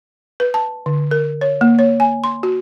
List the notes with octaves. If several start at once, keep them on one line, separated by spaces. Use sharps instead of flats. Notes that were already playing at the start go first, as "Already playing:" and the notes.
B4
A5
D3
A#4
C#5
A#3
C#5
G#5
C6
F#4